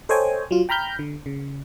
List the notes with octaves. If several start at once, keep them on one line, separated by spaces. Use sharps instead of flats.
A4 C5 C#5 D#5 G5 G#5
F#3 F4
G5 A#5 B5 F6 G6
D3
C#3